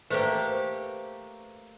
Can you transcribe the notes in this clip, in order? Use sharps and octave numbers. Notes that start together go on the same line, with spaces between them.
A3 A#3 G4 B4 C5